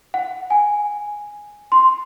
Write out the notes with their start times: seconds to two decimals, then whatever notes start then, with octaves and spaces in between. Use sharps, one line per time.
0.14 F#5
0.50 G#5
1.72 C6